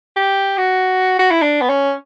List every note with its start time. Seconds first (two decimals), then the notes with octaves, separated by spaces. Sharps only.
0.16 G4
0.58 F#4
1.19 F#4
1.31 E4
1.42 D4
1.61 B3
1.69 C#4